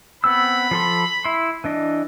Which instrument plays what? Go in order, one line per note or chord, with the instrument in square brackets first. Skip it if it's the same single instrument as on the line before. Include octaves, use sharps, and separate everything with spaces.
[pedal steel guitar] B3 C4 E6 [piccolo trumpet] B5
[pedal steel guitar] F3 A4 C6
E4 C6
E3 D4 D#5